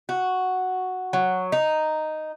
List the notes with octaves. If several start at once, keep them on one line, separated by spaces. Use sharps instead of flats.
F#4
F#3
D#4